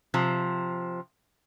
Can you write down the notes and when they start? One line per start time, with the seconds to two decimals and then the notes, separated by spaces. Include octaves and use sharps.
0.14 C3 F3